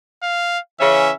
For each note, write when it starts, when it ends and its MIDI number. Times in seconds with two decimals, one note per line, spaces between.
0.23 0.59 77
0.80 1.10 49
0.80 1.10 52
0.80 1.10 61
0.80 1.14 76